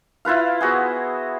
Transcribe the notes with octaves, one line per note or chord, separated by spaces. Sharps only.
E4 F4 B4 F5
B3 F#4 G#4 C5